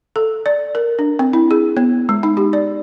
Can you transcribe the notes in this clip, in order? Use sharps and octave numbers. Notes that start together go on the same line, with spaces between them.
A4
D5
A#4
D4
C4
E4
G#4
B3
G#3
D#4
G4
D5